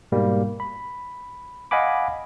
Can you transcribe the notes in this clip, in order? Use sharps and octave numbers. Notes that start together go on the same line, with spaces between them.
G#2 B2 G3 A#3
B5
D#5 F5 F#5 G#5 B5 D6